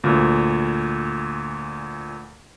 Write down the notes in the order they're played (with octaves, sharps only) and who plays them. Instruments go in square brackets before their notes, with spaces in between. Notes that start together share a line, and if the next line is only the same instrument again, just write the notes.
[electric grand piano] D2 A#2